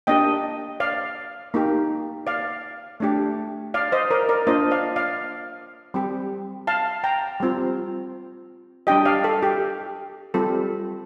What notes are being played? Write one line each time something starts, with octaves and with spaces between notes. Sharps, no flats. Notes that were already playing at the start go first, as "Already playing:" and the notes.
A#3 D4 G4 D#5 G5
D5 F5
A#3 D#4 G4
D5 F5
A3 D4 G4
D5 F5
C5 D#5
A#4 D5
A#4 D5
A#3 D4 F4 C5 D#5
D5 F5
D5 F5
G3 C4 G4
F5 A5
G5 A#5
G3 C4 F4
G3 D4 G4 D#5 G5
D5 F5
A4
G4
G3 C4 F4 A4